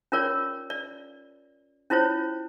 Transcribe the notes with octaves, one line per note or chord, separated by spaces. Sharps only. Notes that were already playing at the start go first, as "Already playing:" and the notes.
C#4 F4 A#4 C#5 D5
D5
C#4 E4 F4 C5 C#5